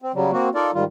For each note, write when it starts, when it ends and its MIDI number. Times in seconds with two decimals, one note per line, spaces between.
0.02 0.12 60
0.14 0.31 49
0.14 0.31 54
0.14 0.31 55
0.33 0.49 58
0.33 0.49 60
0.33 0.49 66
0.55 0.71 63
0.55 0.71 65
0.55 0.71 69
0.55 0.71 70
0.55 0.71 74
0.75 0.84 44
0.75 0.84 51
0.75 0.84 55
0.75 0.84 65